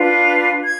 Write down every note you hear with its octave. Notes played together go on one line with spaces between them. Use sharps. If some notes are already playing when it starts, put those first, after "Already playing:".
Already playing: D4 F4 B4
G#6